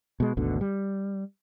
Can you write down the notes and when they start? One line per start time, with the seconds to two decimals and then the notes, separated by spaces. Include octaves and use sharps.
0.20 B2 G#3
0.37 G#1 D2 B2 D3
0.61 G3